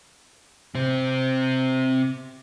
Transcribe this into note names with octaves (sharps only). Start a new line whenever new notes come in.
C3 C4